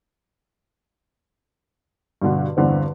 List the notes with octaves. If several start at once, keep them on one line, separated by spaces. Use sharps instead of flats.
G2 B2 D3
E2 G2 D3 C4